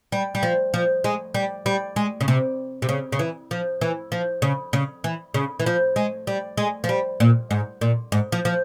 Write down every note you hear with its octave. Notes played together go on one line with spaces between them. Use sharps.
G3
G3
F3
F3
G#3
G3
G3
G#3
C#3
C3
C3
C#3
C#3
E3
F3
E3
F3
C#3
C#3
E3
C#3
E3
F3
G#3
G3
G#3
F3
G3
A#2
G#2
A#2
G#2
F3
F3